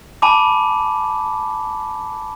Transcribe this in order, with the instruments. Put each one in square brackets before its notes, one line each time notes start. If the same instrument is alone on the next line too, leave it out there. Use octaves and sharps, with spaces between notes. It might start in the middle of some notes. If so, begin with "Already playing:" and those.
[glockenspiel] G#5 A5 B5 D6